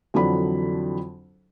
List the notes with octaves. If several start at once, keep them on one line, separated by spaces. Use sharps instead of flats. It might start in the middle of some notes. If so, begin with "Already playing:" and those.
F2 D3 E3 F#3 D4 B5